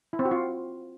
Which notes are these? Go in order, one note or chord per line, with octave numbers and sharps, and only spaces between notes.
E4
C4
F#4
F4